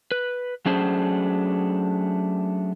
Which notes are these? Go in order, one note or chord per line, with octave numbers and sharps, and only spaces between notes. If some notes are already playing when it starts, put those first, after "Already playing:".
B4
F#3 A3 C#4 D4 G#4 C5